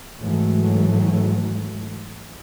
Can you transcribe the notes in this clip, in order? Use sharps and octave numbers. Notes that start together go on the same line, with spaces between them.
G#2 E3 F#3 A3